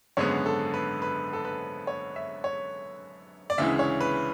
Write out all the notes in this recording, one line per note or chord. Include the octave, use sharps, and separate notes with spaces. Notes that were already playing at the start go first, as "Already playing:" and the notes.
G#1 F#2 D3 G#3 B3 C#5
A4
B4
B4
A4
B4
C#5
E5
C#5
D5
D2 C#3 E3 G#3 E5
C#5
B4